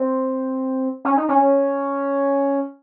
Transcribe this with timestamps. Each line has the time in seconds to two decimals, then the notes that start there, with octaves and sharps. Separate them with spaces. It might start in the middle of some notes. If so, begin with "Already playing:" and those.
Already playing: C4
1.05 C#4
1.17 D#4
1.29 C#4